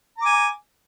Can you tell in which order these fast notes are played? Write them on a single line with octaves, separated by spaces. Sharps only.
A#5 D6 G#5